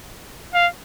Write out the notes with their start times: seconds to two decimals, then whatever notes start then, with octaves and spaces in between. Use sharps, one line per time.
0.54 F5